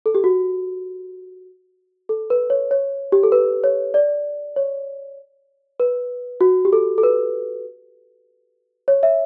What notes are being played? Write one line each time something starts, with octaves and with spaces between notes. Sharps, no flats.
A4
G4
F#4
A4
B4
C#5
C#5
G4
A4
B4
C#5
D5
C#5
B4
F#4
G4
A4
A4
B4
C#5
E5